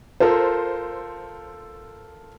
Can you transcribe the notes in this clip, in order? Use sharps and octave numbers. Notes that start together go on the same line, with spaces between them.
F4 A4 A#4 C5